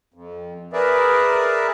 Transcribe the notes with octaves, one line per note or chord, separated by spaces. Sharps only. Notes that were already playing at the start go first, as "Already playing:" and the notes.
F2
G#4 A#4 B4 D5 E5